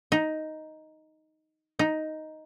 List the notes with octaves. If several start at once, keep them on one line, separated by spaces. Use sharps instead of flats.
D#4
D#4